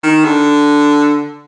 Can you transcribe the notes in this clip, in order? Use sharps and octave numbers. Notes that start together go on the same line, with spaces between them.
D#3
D3